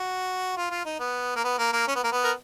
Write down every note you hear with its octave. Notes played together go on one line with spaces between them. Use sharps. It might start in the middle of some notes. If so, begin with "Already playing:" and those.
Already playing: F#4
F4
F4
D#4
B3
A#3
B3
A#3
A#3
C#4
B3
A#3
B3
A#4